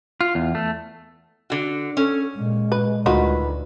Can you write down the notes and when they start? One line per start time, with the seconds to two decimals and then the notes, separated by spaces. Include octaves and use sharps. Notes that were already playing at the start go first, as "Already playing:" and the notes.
0.21 F4
0.35 E2
0.55 A3
1.50 D3 F#4
1.97 C#4 A4
2.36 A#2 G#3
2.72 B4
3.06 D2 D#3 F4 F#4 B4